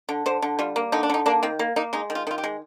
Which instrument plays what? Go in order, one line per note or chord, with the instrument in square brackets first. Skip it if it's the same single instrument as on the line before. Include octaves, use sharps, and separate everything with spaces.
[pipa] D3
D3 C5
D3
G3 F4
A#3
D3 D#4
D4
D3 D#4
A#3 D4
D#3 C4
A#3
A#3 D#4
G#3 D#4
D#3
F4
D#3 F4
G4
G#3